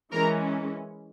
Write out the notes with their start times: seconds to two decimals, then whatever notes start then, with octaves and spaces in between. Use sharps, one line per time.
0.12 E3 G#3 C#4 A#4 A#5